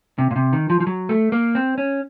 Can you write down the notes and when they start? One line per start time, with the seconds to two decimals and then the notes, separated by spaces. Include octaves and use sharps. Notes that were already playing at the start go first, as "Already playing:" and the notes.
0.18 C3
0.31 A#2
0.36 C3
0.53 D#3
0.70 F3
0.80 F3
0.87 F#3
1.09 A3
1.32 A#3
1.55 C4
1.78 C#4